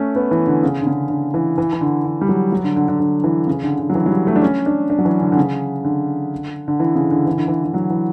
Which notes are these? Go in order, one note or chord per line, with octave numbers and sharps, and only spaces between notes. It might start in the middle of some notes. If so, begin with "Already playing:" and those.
Already playing: A3 C#4
B3
E3
D3
C#3
D3
C#3
D3
E3
E3
E3
D3
D3
G3
F#3
F#3
D3
D3
D3
D3
E3
C#3
D3
D3
F#3
E3
F#3
G3
A3
D4
C#4
D4
D4
F#3
E3
D3
D3
C#3
D3
D3
E3
C#3
D3
E3
D3
E3
E3
F#3
E3